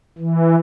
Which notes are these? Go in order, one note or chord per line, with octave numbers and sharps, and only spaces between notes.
E3